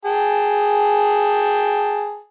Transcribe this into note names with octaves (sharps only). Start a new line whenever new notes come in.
G#4 G5 A5